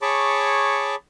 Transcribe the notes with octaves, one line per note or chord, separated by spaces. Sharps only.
G#4 C#5 A5 B5 C#6 D6